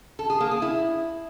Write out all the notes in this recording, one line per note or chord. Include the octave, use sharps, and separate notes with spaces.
A4
G#4
A#3
G#4
E4